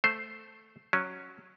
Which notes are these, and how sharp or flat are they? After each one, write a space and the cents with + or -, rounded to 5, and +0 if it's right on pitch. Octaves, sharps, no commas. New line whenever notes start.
A3 +0 C5 +0
F#3 -5 C#4 +0